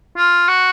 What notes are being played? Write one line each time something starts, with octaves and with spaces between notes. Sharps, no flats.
F4
F#4